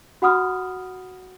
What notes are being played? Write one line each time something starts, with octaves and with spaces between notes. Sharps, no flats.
F#4 F#5 B5 D#6 F6